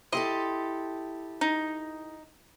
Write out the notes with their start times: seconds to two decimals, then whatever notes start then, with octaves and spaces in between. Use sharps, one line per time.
0.12 E4 G4 A4 D#5 C6
1.41 D#4